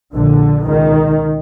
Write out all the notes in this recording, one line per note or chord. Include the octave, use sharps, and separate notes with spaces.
A#1 A#2 D3
C#2 B2 D#3